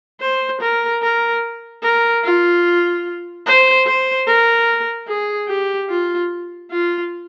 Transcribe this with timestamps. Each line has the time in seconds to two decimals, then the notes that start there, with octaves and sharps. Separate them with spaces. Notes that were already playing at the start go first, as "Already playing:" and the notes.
0.21 C5
0.61 A#4
1.03 A#4
1.83 A#4
2.23 F4
3.46 C5
3.86 C5
4.27 A#4
5.08 G#4
5.48 G4
5.89 F4
6.71 F4